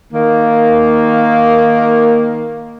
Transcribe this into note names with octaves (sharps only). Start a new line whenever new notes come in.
D#3 A#3